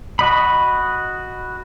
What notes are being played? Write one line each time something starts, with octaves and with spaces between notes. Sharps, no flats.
F#4 D#5 B5